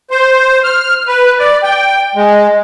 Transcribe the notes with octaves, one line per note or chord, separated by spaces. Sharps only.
C5
F6
B4
D5
G5
G#3